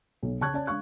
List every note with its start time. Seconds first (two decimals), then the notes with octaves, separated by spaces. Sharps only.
0.23 B1
0.41 C#3 A5 C#6 F#6 G#6
0.54 C#4 D5 A5
0.67 G#3 D4 F5 C#6 F#6